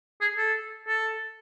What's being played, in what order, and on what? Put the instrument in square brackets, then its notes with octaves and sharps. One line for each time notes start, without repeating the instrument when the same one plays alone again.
[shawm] G#4
A4
A4